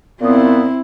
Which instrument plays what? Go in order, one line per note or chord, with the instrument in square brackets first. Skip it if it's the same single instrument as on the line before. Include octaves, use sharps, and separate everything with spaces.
[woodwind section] A#2 B3 [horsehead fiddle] C4 E4